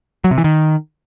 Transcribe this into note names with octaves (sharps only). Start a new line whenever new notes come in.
F#3
C3
E3
D#3